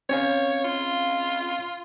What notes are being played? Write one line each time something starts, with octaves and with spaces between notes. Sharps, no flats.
C4 C#4 C#5 F5
F4